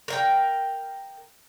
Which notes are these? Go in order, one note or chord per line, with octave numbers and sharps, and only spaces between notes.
A#4 F5 G5